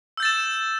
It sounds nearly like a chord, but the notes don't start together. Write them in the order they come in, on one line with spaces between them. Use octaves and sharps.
E6 G6 A6 E7